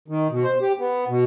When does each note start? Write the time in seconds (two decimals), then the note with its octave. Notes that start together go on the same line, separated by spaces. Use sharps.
0.08 D#3
0.30 B2
0.44 C5
0.61 G4
0.79 B3
1.08 B2